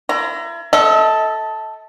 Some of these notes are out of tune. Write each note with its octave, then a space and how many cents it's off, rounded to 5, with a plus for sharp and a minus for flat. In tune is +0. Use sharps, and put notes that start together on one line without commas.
E4 +40 A#5 +0
A4 +0 D#5 +45